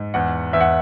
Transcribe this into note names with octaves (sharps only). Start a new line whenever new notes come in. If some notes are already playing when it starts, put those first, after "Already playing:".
Already playing: G#2
E2 F#5
E2 E5
F#5